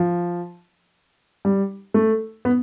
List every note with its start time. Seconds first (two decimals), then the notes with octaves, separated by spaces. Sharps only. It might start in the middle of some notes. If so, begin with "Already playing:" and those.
Already playing: F3
1.45 G3
1.94 A3
2.45 B3